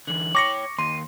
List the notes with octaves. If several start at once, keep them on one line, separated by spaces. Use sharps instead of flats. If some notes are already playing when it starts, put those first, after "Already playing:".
D3 E3 F#7
C#5 G5 C#6 D6 A#6 C#7
D#2 C6 D#7